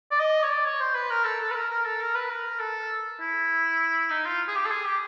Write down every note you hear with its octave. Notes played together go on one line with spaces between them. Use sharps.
D5
D#5
C#5
D5
C#5
C5
B4
A#4
A4
A4
B4
A#4
A#4
A4
A#4
B4
A#4
A4
E4
D#4
F4
G#4
G4
A4
G#4
G4